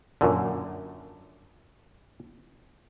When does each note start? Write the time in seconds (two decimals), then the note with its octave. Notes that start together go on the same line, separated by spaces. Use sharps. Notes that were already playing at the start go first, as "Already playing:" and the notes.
0.21 F#2 A#2 D3